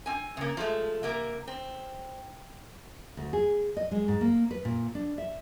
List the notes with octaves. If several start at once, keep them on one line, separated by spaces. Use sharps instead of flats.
C4 G#5
C#3 A#3
F3 G#3 A3
C3 A#3 A#4
C4
D2
G#4
D#5
G#3
G#2
A#3
B4
A#2
D4
E5